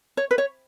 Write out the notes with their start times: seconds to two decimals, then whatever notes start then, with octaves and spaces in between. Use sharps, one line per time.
0.17 C#5
0.31 B4
0.38 C#5